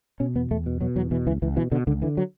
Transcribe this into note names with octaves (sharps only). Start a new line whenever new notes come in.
B2 C#4
E2 B3
E2 A3
B2
B2 F#3
E2 F#3
B2 E3
C#2 E3
C#2 E3
B2 E3
B2 D3
C#2 D3
D3 E3
F#3